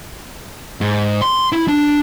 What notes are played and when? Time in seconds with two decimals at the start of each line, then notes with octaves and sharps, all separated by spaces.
0.81 G#2
1.22 C6
1.52 E4
1.68 D4